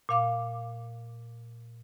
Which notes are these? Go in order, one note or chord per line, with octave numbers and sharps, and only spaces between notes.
A#2 F5 D6